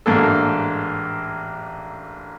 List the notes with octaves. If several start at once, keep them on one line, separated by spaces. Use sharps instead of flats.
A1 G#2 A#3 D4 A4